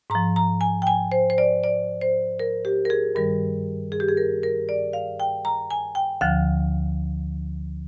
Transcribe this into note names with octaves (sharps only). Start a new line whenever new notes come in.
G#2 A#5
F3
A#5
G#5
G5
G#5
C5
C5
D5
D5
C5
A#4
G4
A#4
G#4
G2 D#3 G3 A#4
G#4
G4
G#4
A#4
A#4
D5
F5
G5
A#5
G#5
G5
D2 D3 F3 F5